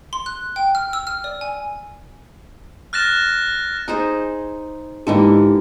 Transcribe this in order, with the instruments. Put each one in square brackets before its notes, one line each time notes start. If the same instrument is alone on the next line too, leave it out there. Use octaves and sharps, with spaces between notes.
[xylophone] C6
F#6
G5
F6
E6
F6
D5
G#5
[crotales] F6 F#6 A6 A#6 E7
[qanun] D#4 G#4 C5
[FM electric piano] G#2 D#4 G4 [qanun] D3 E3 A#3